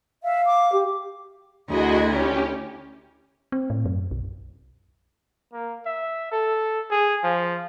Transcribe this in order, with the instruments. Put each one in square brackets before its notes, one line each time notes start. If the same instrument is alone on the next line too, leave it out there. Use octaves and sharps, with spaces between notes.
[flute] E5 [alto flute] F5
[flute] D6
[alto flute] G4
[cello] D2 E4 [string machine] F#4 G#4 D#5
[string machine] C#4 G4
[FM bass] C4
A2
F#2
B1
[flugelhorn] A#3
E5
A4
G#4
F3